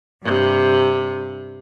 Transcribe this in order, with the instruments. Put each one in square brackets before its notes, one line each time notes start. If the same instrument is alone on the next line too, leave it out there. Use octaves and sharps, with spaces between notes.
[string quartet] G2 C3